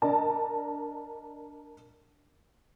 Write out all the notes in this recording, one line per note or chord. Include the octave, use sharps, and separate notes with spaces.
D4 A#4 D5 D#5 A5